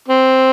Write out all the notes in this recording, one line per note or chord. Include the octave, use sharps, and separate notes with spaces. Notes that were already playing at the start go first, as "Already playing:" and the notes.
C4